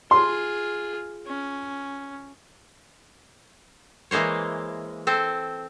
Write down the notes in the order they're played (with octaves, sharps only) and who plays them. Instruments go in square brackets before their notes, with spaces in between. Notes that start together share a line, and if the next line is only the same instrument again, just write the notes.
[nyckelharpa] F4 G#4 [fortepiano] C6
[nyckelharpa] C#4
[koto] E3 G#3 A#3 C5 C#5
C4 A4 C5